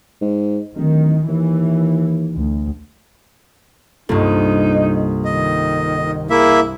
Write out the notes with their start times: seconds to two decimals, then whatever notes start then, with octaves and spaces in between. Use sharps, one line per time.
0.21 G#2
0.76 D1 D#3
1.28 D#2 E3
2.33 D2
4.09 C2 G2 A#3 D#4 F4 A4
5.25 D#3 D#5
6.30 A#3 E4 G#4 E5